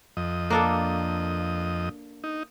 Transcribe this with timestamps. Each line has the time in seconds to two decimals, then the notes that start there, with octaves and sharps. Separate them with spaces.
0.17 F2 D#5
0.50 A#3 D4 A4
2.24 D#4